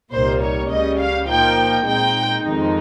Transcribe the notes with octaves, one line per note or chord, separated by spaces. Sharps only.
C2 A#2 G3 A#3 D#4 C5
C#5
C#2 C#3 G3 C#4 D#5
F5
A#2 F3 A#3 D#4 G5
A#2 G#3 C4 D#4 G5
F2 D#3 G#3 C4 D#4